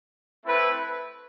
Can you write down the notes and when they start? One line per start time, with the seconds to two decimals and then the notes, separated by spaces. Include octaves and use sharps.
0.44 A3 C4 E4 B4